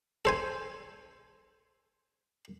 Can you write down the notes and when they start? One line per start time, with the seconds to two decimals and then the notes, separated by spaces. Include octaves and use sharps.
0.25 A4 C5 G#5